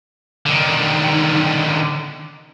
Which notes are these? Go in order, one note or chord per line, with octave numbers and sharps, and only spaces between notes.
D3 D#3